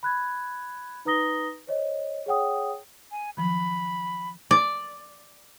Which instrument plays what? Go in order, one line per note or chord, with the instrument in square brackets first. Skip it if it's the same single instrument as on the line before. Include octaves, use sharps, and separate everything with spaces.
[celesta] B5 F#6 G#6
D#4 B4 A#5 D#6 A#6 G7
C5 C#5 D#5
G#4 C#5 F#5 G5 D#6
[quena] G#5
[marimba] D#3 F3 F#3 [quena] B5
[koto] D5